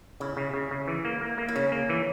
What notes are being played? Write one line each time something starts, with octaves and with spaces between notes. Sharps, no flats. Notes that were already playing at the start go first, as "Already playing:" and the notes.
C#3 E4
C#3
C#3
C#3
E3
A#3
A#3
A#3
E4
C#3 C#4
A#3
E3